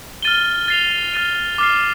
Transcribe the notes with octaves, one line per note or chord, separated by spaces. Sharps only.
F6 A6 D#7 G7
A6 C7 F7
F6 A6 D#7
D6 F6 C7